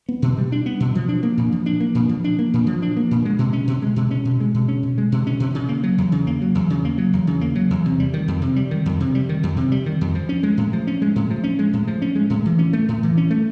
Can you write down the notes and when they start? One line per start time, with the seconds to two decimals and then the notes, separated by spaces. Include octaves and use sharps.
0.09 B3
0.22 B2
0.38 G3
0.52 D4
0.66 B3
0.80 B2
0.95 F3
1.09 D4
1.23 A#3
1.37 A#2
1.52 F3
1.66 D4
1.80 A#3
1.95 A#2
2.09 F3
2.24 D4
2.39 A#3
2.53 A#2
2.67 F3
2.82 D4
2.97 A#3
3.11 A#2
3.25 G#3
3.39 B2
3.53 C#4
3.67 B2
3.82 G#3
3.96 B2
4.11 C#4
4.25 B2
4.40 G#3
4.54 B2
4.68 C#4
4.83 B2
4.98 G#3
5.12 B2
5.27 C#4
5.40 B2
5.55 C#3
5.69 A#3
5.83 F#3
5.98 E2
6.12 C#3
6.27 A#3
6.42 F#3
6.55 E2
6.70 C#3
6.85 A#3
6.98 F#3
7.13 E2
7.27 C#3
7.41 A#3
7.55 F#3
7.71 E2
7.85 C3
8.00 G3
8.14 D#3
8.28 F2
8.42 C3
8.56 G3
8.71 D#3
8.86 F2
9.00 C3
9.15 G3
9.29 D#3
9.43 F2
9.57 C3
9.72 G3
9.86 D#3
10.01 F2
10.15 F3
10.29 C#4
10.43 G#3
10.57 A2
10.73 F3
10.87 C#4
11.02 G#3
11.16 A2
11.30 F3
11.44 C#4
11.59 G#3
11.73 A2
11.87 F3
12.02 C#4
12.16 G#3
12.30 A2
12.45 E3
12.59 C#4
12.73 A3
12.88 A2
13.03 E3
13.17 C#4
13.31 A3